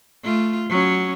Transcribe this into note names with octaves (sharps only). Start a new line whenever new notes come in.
A3 F4
F#3 C#4